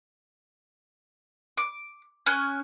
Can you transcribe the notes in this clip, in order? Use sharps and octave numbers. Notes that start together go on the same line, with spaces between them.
D6
C#4 G#5 F#6